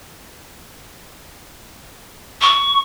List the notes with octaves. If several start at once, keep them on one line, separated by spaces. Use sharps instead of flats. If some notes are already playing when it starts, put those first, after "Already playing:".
C#6